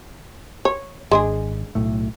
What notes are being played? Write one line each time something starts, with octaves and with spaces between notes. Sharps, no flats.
C#5
G#1 G#3 D4 G#4
B1 A2 A3